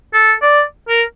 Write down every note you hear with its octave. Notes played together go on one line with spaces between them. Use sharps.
A4
D5
A#4